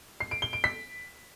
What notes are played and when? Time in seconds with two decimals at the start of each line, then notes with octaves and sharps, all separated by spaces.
0.20 C7
0.31 D7
0.42 G7
0.53 D7
0.64 B6